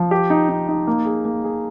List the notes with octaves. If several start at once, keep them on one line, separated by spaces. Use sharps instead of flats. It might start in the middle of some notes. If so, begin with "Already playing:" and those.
Already playing: F3
G4
D#4
D#4
D#4
A#3
G#4
A#3
G#4